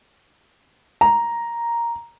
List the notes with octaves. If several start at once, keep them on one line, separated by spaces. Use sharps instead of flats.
A#5